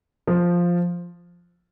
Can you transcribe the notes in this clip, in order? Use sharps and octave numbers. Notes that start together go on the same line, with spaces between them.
F3